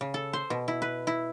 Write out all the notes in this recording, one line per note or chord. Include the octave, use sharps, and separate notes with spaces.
C#3
A4
C5
B2
E4
B4
E4